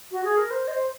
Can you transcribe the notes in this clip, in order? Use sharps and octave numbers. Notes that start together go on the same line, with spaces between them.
F#4
G#4
A#4
C5
D#5
C5